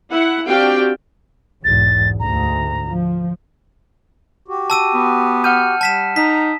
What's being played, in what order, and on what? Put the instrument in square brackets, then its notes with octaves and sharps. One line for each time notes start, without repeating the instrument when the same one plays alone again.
[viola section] E4 F#5
C4 D4 F#4 G4 F5 G5
[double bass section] B1 E2 G#2 [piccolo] A6
[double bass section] D2 G#2 [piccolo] A#5
[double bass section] F3
[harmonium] F#4 G4
[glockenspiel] A5 E6 D#7
[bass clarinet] B3
[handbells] F#5 F6 G6 [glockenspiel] D#7
[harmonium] G3 [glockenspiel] A5 B6 E7
[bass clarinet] D#4 [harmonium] A#5 [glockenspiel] B6